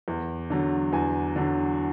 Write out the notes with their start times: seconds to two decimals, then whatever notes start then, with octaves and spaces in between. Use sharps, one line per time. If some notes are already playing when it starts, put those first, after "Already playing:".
0.08 E2
0.50 D3 F#3
0.93 E2 G#5
1.36 D3 F#3